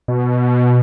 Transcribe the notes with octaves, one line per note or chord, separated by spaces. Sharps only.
B2